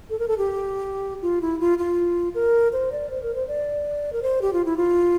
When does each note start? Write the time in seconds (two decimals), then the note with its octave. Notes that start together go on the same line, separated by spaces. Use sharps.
0.10 A4
0.19 A#4
0.28 A4
0.38 G4
1.22 F4
1.41 E4
1.60 F4
1.78 F4
2.35 A#4
2.73 C5
2.92 D5
3.10 C5
3.22 A#4
3.35 C5
3.48 D5
4.13 A#4
4.22 C5
4.42 G4
4.53 F4
4.65 E4
4.77 F4